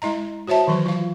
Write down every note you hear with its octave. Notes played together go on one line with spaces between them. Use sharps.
G#3 E4 D#5 A#5
F#4 C5 C#5 E5 A5
D#3 E3 F#3 B4
F4 F5